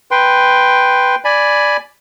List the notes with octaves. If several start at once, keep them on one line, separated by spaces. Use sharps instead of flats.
B4 G5 C6
D5 G#5 B5